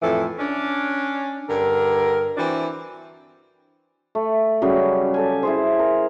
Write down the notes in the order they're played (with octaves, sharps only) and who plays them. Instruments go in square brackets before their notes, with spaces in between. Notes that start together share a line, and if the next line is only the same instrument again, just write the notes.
[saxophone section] F2 A2 E3 A4
C#4 D4
G2 D3 A#4
E3 C4 D4 F#4
[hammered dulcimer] A3
C#3 F#3 G3 G#4
G4 A4 G#5
E4 G#4 C5
A#4